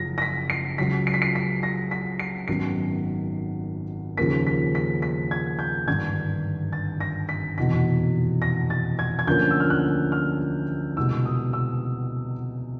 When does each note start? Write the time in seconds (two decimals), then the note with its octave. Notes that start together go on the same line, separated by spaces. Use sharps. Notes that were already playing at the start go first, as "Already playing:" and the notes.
Already playing: F#1 F#2 C#3 F3 A#6
0.18 A#6
0.22 B6
0.50 C7
0.78 C#2 C#3 F#3 B6
1.07 C7
1.14 B6
1.22 C7
1.35 B6
1.63 A#6
1.91 B6
2.19 C7
2.48 G#1 F#2 D#3 F#3 B3 C7
4.18 D#2 C#3 F3 A#3 B6
4.47 B6
4.75 B6
5.02 B6
5.31 G#6
5.59 G6
5.87 G#1 G2 D3 G#6
6.73 A6
7.00 A#6
7.29 B6
7.57 F1 E2 B2 B6
8.42 A#6
8.70 A6
8.99 G#6
9.19 G#6
9.27 D2 D3 F3 A#3 C#4 G6
9.51 E6
9.60 F6
9.70 F#6
10.12 F6
10.97 C2 B2 G#3 B3 E6
11.25 D#6
11.53 E6